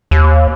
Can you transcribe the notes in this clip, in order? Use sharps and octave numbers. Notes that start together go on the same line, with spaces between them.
D#2